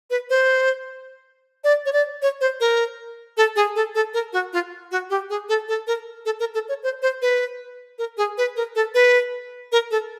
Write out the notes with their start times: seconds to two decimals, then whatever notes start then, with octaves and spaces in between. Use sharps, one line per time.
0.10 B4
0.30 C5
1.64 D5
1.86 C#5
1.93 D5
2.22 C#5
2.41 C5
2.60 A#4
3.37 A4
3.56 G#4
3.76 A4
3.95 A4
4.14 A#4
4.33 F#4
4.53 F4
4.91 F#4
5.10 G4
5.30 G#4
5.49 A4
5.68 A4
5.87 A#4
6.25 A4
6.40 A#4
6.54 A4
6.69 C#5
6.83 C5
7.02 C5
7.22 B4
7.98 A#4
8.17 G#4
8.38 B4
8.56 A#4
8.75 A4
8.94 B4
9.72 A#4
9.91 A4